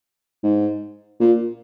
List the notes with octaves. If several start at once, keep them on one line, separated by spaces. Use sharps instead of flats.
G#2
A#2